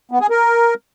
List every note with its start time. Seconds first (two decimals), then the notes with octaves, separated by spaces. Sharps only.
0.12 B3
0.21 G#4
0.30 A#4